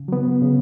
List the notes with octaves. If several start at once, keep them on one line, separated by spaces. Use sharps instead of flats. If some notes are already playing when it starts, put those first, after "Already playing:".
Already playing: C#3
F#3 B3
C#3